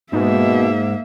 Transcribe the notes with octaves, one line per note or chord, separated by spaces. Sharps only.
G#2 B2 A#3 E5